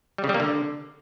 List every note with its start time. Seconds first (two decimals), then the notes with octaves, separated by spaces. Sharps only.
0.18 G3
0.24 C#3
0.29 G3
0.34 A#3
0.40 D3